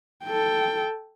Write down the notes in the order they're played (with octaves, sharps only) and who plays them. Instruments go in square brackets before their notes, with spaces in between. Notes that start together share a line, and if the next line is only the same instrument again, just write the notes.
[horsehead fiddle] A4 G5